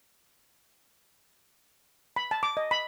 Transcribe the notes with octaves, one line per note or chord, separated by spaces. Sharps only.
B5
A5
D6
D#5
B5